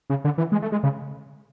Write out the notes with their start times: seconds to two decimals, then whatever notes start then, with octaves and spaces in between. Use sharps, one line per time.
0.10 C#3
0.25 D3
0.38 E3
0.52 G#3
0.62 A3
0.72 G#3
0.83 C#3